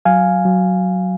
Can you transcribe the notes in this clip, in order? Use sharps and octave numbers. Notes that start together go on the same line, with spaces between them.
F#3 F5 G#5
F#3